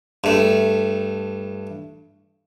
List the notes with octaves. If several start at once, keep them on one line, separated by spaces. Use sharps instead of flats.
G2 A3